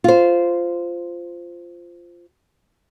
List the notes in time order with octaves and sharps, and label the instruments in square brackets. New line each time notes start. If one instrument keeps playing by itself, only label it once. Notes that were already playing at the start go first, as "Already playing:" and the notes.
[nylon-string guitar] F4 C5